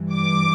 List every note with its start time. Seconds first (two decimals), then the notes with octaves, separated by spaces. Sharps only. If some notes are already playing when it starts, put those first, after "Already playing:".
Already playing: G2 E3
0.13 D6